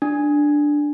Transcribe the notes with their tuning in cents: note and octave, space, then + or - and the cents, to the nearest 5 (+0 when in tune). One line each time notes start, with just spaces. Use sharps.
D4 +0